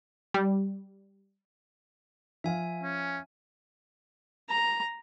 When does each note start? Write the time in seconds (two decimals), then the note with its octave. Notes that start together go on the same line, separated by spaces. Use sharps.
0.34 G3
2.44 F3 E5 F5 G#5
2.83 C#4
4.49 A#5